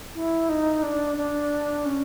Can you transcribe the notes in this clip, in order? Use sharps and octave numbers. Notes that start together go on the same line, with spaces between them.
E4
D#4
D4
D4
C#4